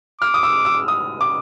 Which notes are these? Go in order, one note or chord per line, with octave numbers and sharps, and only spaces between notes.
D6 F6
D#6
E6
E6
D#6
D6